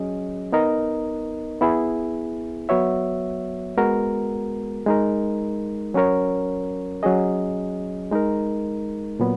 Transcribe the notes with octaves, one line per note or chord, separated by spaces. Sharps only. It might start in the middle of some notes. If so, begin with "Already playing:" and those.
Already playing: F#3 C#4 G#4 D#5
B3 D#4 A#4 D#5
B3 E4 G#4
F#3 B3 F#4 C#5 E5
G#3 B3 F#4 A#4
G#3 D#4 A#4
F#3 C#4 F#4 A#4 C#5
F#3 C#4 G#4 D#5
G#3 D#4 A#4
A#2 F#3 B3